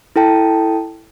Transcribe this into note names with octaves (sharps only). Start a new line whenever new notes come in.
E4 A4 G5 A5